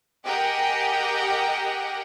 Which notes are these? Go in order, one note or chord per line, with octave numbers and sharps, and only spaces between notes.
G4 G#4 A#4 D#5 F#5 G5